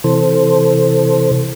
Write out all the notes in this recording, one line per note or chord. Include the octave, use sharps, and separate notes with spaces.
C3 E3 A4 C5